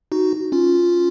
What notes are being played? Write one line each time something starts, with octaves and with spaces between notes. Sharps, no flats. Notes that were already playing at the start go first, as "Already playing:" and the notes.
D#4 F#4
C#4 F4